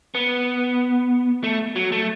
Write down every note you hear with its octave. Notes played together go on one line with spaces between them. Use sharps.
B3
A3
F#3
A3